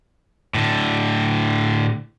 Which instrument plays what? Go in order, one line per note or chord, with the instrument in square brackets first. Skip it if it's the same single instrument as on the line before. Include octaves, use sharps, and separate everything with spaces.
[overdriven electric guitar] A2 D3